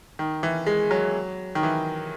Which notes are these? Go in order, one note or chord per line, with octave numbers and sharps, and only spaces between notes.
D#3
E3
G#3
F#3
D#3
E3